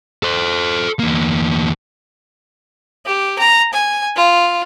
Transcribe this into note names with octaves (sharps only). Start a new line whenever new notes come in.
A4 C5
E2 A#3
G4
A#5
G#5
F4